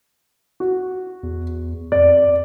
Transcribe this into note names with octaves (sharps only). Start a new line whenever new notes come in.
F#4
E2
F2 D5